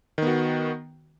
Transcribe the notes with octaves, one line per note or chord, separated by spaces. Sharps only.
D#3 B3 F#4